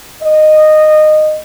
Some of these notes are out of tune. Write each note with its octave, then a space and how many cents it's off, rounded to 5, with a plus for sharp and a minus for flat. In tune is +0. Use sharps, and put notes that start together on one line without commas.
D#5 -15